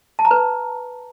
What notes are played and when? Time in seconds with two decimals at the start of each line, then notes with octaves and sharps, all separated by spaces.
0.19 A5
0.25 A#5
0.31 B4